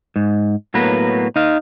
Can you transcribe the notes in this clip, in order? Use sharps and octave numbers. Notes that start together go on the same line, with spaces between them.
G#2
A2 F#3 A#3 B3 B4
D#4 F5